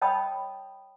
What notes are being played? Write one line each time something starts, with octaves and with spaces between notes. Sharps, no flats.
C#5 D#5 G5 A5 B5 D#6